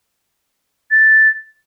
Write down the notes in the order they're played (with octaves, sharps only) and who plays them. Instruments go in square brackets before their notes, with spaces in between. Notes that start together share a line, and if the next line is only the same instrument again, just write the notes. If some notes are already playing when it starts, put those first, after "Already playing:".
[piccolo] A6